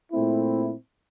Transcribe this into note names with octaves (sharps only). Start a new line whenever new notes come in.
A#2 A3 C4 E4